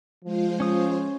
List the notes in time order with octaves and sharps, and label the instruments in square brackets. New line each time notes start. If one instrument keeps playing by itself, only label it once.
[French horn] F3 [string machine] G#3 F4 C5
[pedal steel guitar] C#4 D#6